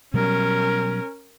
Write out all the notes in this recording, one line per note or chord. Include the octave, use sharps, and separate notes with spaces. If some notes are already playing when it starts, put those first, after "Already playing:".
B2 F#3 G3 C#4 A#4